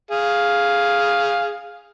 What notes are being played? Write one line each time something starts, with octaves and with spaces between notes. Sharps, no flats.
G#4 F5